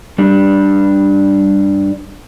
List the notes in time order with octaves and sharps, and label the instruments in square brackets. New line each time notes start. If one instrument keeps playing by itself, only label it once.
[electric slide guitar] G2 G3 D4